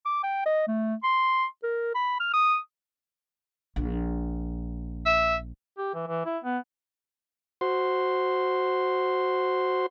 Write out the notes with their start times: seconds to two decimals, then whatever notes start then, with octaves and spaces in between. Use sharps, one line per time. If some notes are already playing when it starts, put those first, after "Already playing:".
0.06 D6
0.23 G5
0.46 D#5
0.68 A3
1.03 C6
1.63 A#4
1.95 B5
2.20 F6
2.34 D#6
3.76 A#1
5.06 E5
5.78 G4
5.94 E3
6.08 E3
6.26 E4
6.44 B3
7.61 F#4 C5 C6